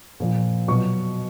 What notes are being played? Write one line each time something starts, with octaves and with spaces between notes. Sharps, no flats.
A#2 F3
B2 F#3 C#6